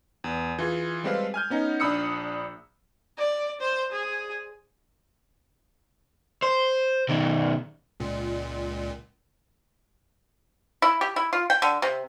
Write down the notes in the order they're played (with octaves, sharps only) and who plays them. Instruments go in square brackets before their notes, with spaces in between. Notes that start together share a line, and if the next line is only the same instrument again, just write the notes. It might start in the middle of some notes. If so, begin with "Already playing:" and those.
[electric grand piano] E2
E3 F4 G#4
G3 G#3 C4 A4 B4 F5
G#5 F6 G6
B3 C#4 D#4
A#1 D4 B5 D#6 E6 C#7
[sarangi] D5
C5
G#4
[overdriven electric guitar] C5
B2 D#3
[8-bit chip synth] C#2 A#2
[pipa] E4
G4
E4
F4
G5
D3
C3